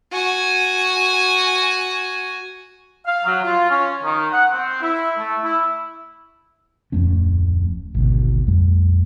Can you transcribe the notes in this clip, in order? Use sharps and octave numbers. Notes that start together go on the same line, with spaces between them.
F#4 G#5
F5
F#3
F4
C#4
D#3
F#5
C4
E4
A3
E4
D1 F2 A3 C#4
G#1 D2 B2
A#1 F2 G3 A3